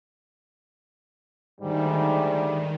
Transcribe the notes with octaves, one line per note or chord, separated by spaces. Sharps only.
D2 G#2 D#3 G3